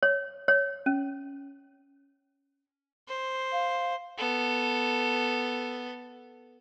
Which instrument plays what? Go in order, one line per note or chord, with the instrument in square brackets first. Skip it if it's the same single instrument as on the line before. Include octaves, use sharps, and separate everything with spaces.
[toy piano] C#5
C#5
C#4
[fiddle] C5
[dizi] F5
[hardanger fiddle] B3 A4